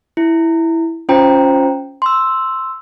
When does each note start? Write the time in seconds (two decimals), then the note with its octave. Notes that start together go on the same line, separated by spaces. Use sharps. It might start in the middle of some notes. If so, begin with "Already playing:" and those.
0.17 E4
1.09 C#4 F4 C5 G5 A#5
2.02 C6 E6